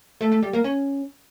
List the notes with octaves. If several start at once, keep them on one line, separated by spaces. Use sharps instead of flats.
A3
A3
G3
A#3
C#4